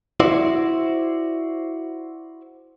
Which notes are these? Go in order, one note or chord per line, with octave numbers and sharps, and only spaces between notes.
E4 F#4 C5 D5